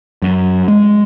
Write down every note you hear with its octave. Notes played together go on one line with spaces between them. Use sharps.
F#2
G#3